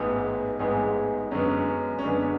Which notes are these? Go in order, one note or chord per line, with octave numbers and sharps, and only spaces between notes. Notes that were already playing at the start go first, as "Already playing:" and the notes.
Already playing: A1 G#2 G#3 B3
A1 G#2 G#3 B3 G#4
F#2 D3 G#3 B3 C#4
C#4
F#2 D3 G#3 B3 D4